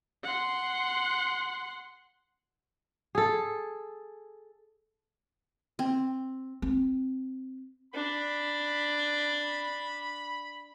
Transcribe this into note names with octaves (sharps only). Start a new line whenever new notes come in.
F#5 C6
G#4 A4
C4
C4
D4 B5